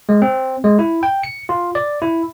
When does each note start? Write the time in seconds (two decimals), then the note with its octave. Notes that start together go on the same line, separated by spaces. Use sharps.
0.09 G#3
0.22 C4
0.64 G#3
0.79 E4
1.03 G5
1.23 C#7
1.49 F4
1.75 D5
2.02 E4